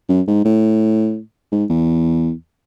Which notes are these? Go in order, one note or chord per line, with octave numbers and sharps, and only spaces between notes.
F#2
G#2
A2
G#2
E2